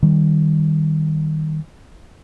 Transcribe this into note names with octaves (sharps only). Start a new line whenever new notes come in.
D#3 G3